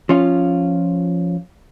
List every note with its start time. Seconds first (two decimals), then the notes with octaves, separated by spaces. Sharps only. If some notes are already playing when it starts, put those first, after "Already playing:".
0.09 F3 C#4 F4